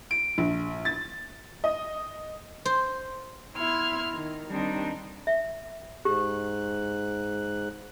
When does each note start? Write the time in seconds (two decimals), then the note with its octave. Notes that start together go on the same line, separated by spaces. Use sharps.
0.11 D7
0.38 A#1
0.85 A6
1.64 D#5
2.65 C5
3.56 B3 E4 C6 F6 G#6
4.13 D#3
4.49 D#3 G3 C4 D4 D#4
5.27 E5
6.05 G#2 G4 F#6